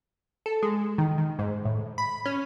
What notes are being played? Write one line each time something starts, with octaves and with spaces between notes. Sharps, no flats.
A4
G#3
D#3
D#3
G#2
A2
B5
C#4